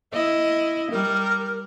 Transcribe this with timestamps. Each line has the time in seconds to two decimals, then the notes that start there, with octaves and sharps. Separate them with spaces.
0.13 E4 D#5
0.91 G3 A#4